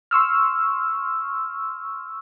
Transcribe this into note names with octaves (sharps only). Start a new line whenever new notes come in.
C6 C#6 E6 F6